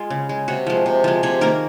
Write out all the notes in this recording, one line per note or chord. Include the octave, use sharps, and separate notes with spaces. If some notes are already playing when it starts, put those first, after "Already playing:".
Already playing: G#3 F4
C#3
G#3
C3 F#4
F3 G#3
C3
F3 G#3
C3 G#4
D#3 A#3 A#4